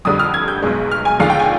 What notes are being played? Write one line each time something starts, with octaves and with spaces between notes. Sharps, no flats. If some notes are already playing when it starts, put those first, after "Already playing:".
F2 D3 G3 D#6
F6
G#6
G6
B1 B2 G#3
F6
G#5
D#2 D3 F3 G#3 F5
G5
G#5